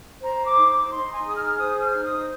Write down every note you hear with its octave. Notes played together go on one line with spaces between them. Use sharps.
C5 A#5
D6
D#4
D6
D#4 C6
G#5
G#4 D#6
F6
C5 D#6
F6
D#4
D#6